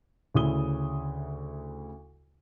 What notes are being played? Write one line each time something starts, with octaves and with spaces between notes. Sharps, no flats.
D2 C#3 E4 D#6 G7